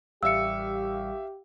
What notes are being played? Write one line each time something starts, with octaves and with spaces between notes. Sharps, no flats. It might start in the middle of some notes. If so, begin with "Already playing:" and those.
A1 G3 G4 E5 F5 E6 C#7